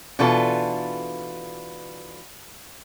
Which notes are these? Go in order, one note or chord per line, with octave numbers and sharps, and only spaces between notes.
B2 E3 D4 F4 A4 B4